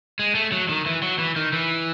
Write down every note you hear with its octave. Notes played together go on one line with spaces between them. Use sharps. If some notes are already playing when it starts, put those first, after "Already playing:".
G#3
A3
F#3
D#3
E3
F#3
E3
D#3
E3